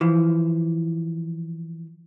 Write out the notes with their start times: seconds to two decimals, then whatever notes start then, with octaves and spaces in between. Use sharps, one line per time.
0.01 E3 F3